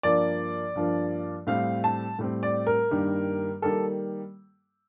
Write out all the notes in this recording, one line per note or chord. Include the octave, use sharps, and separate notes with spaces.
G2 F3 A#3 D5
G2 F3 A#3
A2 G3 C4 F5
A5
A2 G3 C4
D5
A#4
G2 D#3 G3 A#3
D#3 G3 A#3 A4